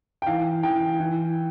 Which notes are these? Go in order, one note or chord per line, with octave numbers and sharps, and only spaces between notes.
G5
E3 F5
E3 G5
E3